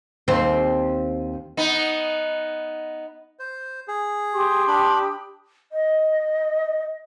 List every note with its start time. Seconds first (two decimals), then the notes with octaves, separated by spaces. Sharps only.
0.28 D#2 C4
1.57 B3 D#4
3.39 C5
3.88 G#4
4.35 G4 C6 D#6
4.67 D4 B5
5.72 D#5